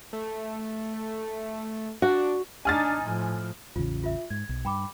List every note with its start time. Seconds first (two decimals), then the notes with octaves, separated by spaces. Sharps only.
0.13 A3
2.02 D4 F#4
2.65 D4 D#4 G#5 F6 A6
3.01 A2 F3
3.76 A1 E2 C#3 F4
4.03 F4 E5
4.30 G#2 G#6
4.49 B1
4.65 G2 G5 B5 D6